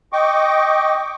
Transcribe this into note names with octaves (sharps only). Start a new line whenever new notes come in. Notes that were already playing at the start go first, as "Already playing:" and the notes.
D#5 G5 C#6 D6